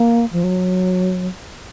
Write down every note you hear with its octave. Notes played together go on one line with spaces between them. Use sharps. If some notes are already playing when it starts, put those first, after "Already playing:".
Already playing: A#3
F3
F#3